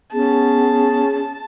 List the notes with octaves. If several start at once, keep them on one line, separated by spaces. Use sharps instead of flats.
B3 C#4 G#4 A5